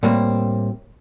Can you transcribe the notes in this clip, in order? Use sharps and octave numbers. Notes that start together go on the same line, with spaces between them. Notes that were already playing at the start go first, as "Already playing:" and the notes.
A2 G3 A#3 C4